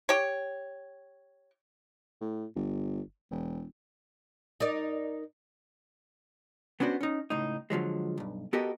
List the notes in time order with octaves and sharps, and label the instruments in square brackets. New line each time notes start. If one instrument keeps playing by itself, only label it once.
[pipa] G4 C#5
[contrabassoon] A2
G1
E1
[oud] D#4 A#4 D5
[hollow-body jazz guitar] B3 C#4 D4 F#4 C5
C#4 D#4
C#2 A2 D#4
D3 F3 F#3 G#3
B1 G2
B3 F#4 G4 A4 A#4 D#5